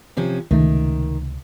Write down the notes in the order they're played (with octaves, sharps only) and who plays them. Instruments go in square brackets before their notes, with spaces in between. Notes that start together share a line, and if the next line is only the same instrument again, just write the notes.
[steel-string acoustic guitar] C3 F3 C#4
[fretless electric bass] C#2 C3 A3 [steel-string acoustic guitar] D#3